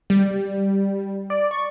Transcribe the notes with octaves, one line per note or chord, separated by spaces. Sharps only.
G3
D5
C#6